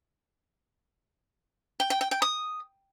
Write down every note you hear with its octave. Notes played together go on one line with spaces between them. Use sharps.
G5
G5
G5
G5
D#6